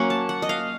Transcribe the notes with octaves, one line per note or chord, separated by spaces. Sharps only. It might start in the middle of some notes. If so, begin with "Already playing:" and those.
Already playing: F#3 A#3 C#4 F#5
A5
F#5
D#5
F5